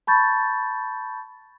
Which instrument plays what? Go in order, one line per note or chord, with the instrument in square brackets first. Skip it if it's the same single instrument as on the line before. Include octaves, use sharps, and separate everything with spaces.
[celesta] A5 B5 C#6 G6 A6